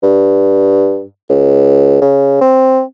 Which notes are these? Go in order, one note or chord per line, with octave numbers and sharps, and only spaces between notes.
G2
C#2
C#3
C4